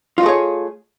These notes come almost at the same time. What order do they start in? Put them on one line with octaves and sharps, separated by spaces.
F4 D#5 A3 G#4 C#5